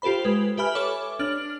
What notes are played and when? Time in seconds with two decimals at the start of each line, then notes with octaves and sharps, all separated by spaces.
0.02 F4 G4 A4 C5 B5
0.24 G#3 B4
0.57 G4 B4 E5 G#5 B5 F6
0.75 A4 C#5 D6
1.19 D4 F6 F#7